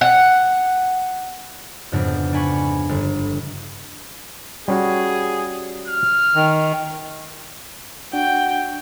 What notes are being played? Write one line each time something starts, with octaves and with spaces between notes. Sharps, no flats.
F#5
F2 G#2 C#3 B3 D4
D4 G#5 B5 C#6
G1
G3 C#4 F#4 G#4
F6
D#3
D4 F#4 G5